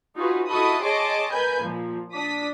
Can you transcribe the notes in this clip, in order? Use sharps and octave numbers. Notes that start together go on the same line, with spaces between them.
D#4 F4 F#4 G#4 B4
E4 F#4 A4 D#5 B5 D#6
G#4 C#5 D#5 A5 C6 D6
A#4 B4 G#5 B5 G6
A#2 F3
D4 D#6 B6